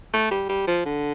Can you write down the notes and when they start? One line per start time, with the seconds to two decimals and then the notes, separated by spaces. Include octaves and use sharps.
0.14 A3
0.31 G3
0.49 G3
0.67 F3
0.86 D3